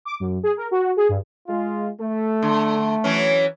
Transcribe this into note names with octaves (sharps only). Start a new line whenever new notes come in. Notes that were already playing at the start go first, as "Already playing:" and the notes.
D6
F#2
G#4
A#4
F#4
G#4
G2
G#3 F4
A3
D3
E3 F#3 C#4